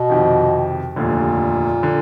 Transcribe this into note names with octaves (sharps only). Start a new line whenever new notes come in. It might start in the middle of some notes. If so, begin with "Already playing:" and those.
Already playing: B2
F2 C3 D#3
F1 D#2 A#2 D3
D3